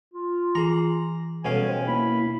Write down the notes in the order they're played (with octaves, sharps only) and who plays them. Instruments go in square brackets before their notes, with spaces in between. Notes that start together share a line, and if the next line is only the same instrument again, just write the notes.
[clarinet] F4
[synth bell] E3 G#4 [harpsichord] A#5
[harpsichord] B2 C#4 F5 [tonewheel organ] G3 A4 [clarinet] G#5
[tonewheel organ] C5 G5
[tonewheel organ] A#3 E4 [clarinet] B5